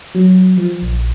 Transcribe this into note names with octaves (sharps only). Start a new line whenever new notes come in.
F#3
F3
A#1